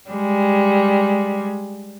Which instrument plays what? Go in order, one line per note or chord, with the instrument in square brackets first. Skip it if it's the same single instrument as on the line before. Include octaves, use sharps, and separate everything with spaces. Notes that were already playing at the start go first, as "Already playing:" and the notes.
[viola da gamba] G3 G#3